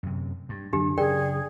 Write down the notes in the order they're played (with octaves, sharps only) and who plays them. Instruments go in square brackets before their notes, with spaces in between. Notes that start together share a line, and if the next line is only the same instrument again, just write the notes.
[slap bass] F#2 C3
G2
[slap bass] F#2 D3 F#3 [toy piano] D4 G4
[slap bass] F#2 C#3 [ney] G#4 [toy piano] A#4 D5 G5